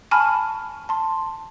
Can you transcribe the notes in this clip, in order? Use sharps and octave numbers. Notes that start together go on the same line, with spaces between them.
G#5 A5 B5 C#6 F6
A5 C6